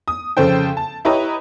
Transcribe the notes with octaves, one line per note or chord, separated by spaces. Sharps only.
D#6
F2 C#3 A4 C5 G5
A5
E4 G4 B4 C#5 D#5 A#5